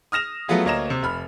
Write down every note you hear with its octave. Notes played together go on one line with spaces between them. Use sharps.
D#6 F6 A#6 E7 F7
F#3 A3 B3 F4 G#4
D2 A#3 C#5 D#5 A#5 E7
C3
F1 B5 F6